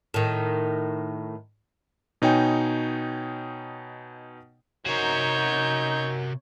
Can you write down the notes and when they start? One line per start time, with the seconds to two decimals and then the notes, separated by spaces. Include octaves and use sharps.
0.14 A2 D#3
2.22 B2 D#4 C#5 G5 G#5
4.87 C3 D#4 F#4 A#4 C5 C#5 G6